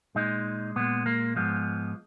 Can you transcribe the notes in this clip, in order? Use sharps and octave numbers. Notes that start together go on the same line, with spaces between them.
A#2 G#3 D#4
A#2 G#3 B3
A#3
G#2 F3 G#3 B3